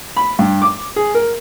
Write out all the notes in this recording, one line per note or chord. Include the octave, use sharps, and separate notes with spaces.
B5
G2
D6
G#4
A#4